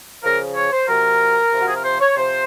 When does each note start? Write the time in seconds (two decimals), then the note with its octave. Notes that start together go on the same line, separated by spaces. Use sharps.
0.23 C#3 F3 A#4
0.56 C#5
0.72 C5
0.88 C3 F#3 A#4
1.52 C3 F3
1.60 F#4
1.68 G#4
1.76 A#4
1.85 C5
2.01 C#5
2.17 C3 F3 C5